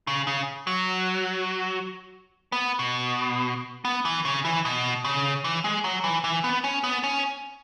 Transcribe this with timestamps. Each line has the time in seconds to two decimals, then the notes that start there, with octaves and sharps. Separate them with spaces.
0.07 C#3
0.27 C#3
0.67 F#3
2.52 B3
2.79 B2
3.85 B3
4.05 E3
4.25 C#3
4.45 E3
4.65 B2
5.05 C#3
5.44 E3
5.64 G#3
5.84 F#3
6.04 E3
6.24 E3
6.44 B3
6.64 C#4
6.84 B3
7.03 C#4